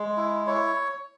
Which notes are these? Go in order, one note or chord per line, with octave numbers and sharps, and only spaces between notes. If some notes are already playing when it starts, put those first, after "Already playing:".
Already playing: G#3
E4
E4 C#5